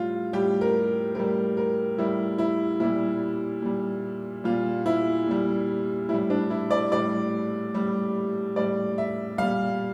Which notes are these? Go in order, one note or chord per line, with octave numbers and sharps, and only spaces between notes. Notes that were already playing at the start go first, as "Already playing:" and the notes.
Already playing: A2 G3 F4
A2 G3 G4
A#4
A2 G3 A#4
A#4
A2 G3 E4
E4
A#2 G3 E4
A#2 G3
A#2 G3 F4
E4
A#2 G3
A2 G3 E4
D4
E4
D5
A2 G3 D5
A2 G3
A2 G3 D5
E5
A#2 G3 F5